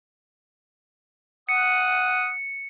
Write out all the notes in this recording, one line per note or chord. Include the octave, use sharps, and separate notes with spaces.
F#5 D#6 C#7